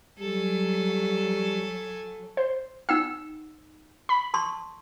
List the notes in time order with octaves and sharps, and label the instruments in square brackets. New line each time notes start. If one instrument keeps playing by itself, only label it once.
[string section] F#3 [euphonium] G3 [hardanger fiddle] A4 G#5
[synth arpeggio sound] C5
[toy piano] D#4 F#5 G5 [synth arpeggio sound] E6
[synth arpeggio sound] B5
[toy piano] A5 C6 C#6